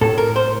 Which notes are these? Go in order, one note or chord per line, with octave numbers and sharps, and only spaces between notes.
A2 A4
A#4
C5